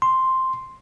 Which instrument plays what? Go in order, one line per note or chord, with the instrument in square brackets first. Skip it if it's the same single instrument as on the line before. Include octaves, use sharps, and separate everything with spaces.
[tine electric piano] C6